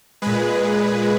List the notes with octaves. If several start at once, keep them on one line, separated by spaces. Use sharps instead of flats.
A#2 G#3 G#4 B4